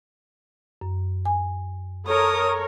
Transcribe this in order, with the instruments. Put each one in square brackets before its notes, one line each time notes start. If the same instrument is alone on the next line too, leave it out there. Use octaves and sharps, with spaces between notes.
[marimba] F#2
G#5
[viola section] A4 A#4 C#5 [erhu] D#6